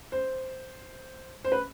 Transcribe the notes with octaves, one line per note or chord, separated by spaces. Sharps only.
C5
C5
B4